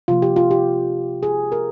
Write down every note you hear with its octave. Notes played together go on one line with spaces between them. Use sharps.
C3 F3 A#3 F4
G4
F4
G4
G#4
A#4